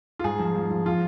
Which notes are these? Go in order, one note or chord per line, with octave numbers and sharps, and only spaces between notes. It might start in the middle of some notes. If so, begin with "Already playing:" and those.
F4
G#2 G#4
F3
F3
F3
F3 F4